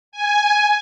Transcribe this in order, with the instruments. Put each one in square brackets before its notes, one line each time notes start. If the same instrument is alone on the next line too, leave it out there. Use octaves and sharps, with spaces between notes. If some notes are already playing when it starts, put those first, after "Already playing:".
[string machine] G#5